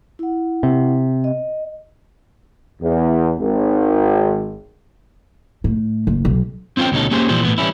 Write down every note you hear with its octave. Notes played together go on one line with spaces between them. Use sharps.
E4 F#5
C3
D#5
E2
G#1
A2
F#1
B1
C4 C#4 F4 C5 G5
D2 B2 C#4 D#4 A4
A#3 C#4 G4 G#4 C5
A#2 E3 F3 G3 C5
A2 C#3 E3 B3
E3 G3 C#4 E4